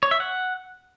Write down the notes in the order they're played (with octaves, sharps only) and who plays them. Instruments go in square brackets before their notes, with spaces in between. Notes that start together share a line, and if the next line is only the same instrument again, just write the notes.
[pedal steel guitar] C#5
E5
F#5